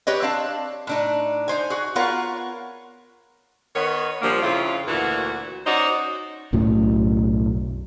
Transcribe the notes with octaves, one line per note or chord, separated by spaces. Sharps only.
G4 B4 C#5 D#5
C4 D4 F5 A5
A2 D4 D#4
D#4 C5 G#5
F#4 G#4
B3 F4 A#4 C#5 F5 F#5
D#3 B3 C#5
A#2 F3 G3 A#3 D4
F2 C#3 C4 E4 F4
D2 A#2 E3 F#4
C#4 D#4 F#4 C5 D5
B1 F#2 A2 F#3